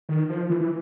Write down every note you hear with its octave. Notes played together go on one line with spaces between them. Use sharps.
D#3
F3
E3
E3